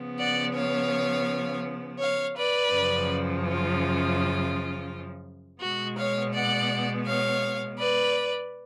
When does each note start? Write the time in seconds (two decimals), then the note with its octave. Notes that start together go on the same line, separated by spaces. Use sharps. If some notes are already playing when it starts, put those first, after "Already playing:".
Already playing: C#3 F3 B3
0.20 D5 F#5
0.56 C#5 F5
2.00 C#5 F5
2.36 B4 D5
2.73 F#2 C#3 F3
3.46 F4
5.62 B2 G#3 B3 F#4
5.98 C#5 F5
6.34 D5 F#5
7.07 C#5 F5
7.79 B4 D5